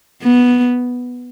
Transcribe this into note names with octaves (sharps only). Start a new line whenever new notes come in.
B3